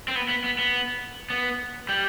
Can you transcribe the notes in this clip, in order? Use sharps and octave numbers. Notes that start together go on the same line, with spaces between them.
C4
B3
B3
B3
B3
B3
G3